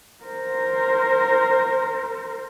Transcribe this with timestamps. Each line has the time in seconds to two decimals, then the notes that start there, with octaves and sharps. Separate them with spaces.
0.24 A#4 C5